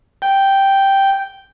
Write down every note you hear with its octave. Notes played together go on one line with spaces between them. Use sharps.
G5